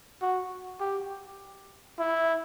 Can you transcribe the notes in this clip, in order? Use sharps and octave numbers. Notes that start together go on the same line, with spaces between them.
F#4
G4
E4